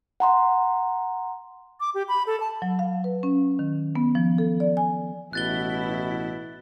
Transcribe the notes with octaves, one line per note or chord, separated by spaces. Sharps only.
F#5 A#5 C6
D6
G4
B5
A4
A5
F#3
F5
B4
C#4
D#3
B3
F3
A4
D5
G#5
A1 B2 E4 F#6 A6 G7